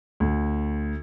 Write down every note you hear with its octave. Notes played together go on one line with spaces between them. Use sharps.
D2